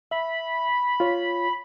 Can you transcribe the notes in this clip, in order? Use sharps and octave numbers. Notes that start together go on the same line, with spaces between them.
E5 B5
F4 C#5